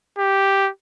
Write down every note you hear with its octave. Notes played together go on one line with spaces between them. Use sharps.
G4